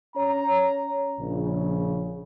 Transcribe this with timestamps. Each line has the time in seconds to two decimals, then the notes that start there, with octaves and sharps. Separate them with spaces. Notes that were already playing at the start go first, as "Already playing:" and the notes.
0.16 C#4 C#5 A#5
1.19 A#1 C#3